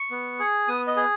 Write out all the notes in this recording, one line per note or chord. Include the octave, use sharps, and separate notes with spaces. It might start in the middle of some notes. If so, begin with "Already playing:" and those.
Already playing: C#6
B3
G#4
B3 D#6
D#5
G#4